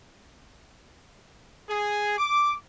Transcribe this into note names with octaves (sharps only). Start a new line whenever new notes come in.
G#4
D6